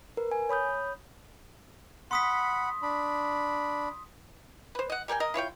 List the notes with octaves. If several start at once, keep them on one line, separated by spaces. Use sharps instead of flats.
A#4 B4
G#5
C#5 B5 D#6 G6
F#5 B5 C6 D#6 B6
D4 B5
B4 C5
D#5 F#5
G3 A#4 G5 G#5
A#4 D#5
E4 F4 C#5 G5